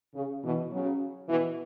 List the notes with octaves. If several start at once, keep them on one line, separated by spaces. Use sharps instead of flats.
C#3
B2 E3
C#3 F#3
B2 E3